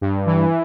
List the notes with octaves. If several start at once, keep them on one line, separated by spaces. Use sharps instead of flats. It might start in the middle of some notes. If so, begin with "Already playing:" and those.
G2
E3